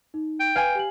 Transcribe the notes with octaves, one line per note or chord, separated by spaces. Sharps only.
D#4
G5
B4 F5 G#5
G4 F#7